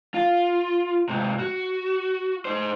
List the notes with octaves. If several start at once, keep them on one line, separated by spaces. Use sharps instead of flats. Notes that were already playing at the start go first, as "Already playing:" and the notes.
F4
G#2 C3
F#4
D#4 C5